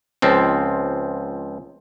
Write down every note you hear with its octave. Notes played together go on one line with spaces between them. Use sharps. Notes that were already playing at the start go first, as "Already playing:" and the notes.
C#2 F3 C4